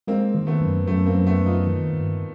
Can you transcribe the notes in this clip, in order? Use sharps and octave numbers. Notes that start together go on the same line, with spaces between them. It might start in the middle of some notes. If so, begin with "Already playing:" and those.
G#3 A#3 C4
D#3
A3 B3
F#2
F#2 A3 B3
A#3 C4
F#2
A3 B3
F#2
D#4 F4
D#3
G2